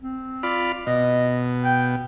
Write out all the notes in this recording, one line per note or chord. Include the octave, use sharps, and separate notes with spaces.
C4
F4 D5 B5
B2 D#5
G5